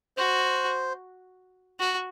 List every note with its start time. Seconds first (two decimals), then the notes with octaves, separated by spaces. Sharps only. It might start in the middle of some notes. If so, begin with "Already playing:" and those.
0.17 F#4 C5
1.79 F#4